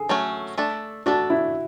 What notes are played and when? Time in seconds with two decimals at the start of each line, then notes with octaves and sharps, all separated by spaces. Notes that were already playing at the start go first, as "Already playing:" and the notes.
Already playing: G#4 A4
0.09 F#3 A3 C#4
0.58 A3 D4 A4
1.06 A3 D4 F#4 A4
1.30 E4